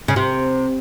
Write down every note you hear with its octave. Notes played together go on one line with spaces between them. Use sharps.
C#3
C3